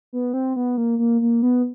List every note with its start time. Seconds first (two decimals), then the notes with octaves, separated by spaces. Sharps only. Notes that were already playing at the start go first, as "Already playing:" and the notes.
0.13 B3
0.34 C4
0.56 B3
0.77 A#3
0.99 A#3
1.21 A#3
1.42 B3